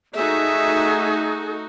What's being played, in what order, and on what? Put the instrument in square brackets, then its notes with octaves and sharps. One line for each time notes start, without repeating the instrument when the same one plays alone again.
[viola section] A3 D#4 F#4 [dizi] G#4 [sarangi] E5